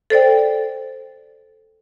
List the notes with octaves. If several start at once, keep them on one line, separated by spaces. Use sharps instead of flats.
A4 C5 D5 G5